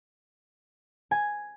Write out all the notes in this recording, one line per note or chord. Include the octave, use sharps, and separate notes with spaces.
G#5